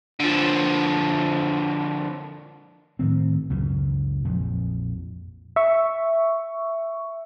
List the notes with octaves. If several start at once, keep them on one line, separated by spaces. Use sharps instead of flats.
D3 F3
A2 D#3 C4
C#2 F#2 C#3
A#1 F2
E5 C#6